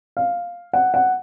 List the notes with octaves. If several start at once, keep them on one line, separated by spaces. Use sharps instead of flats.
F5
F#5
F#5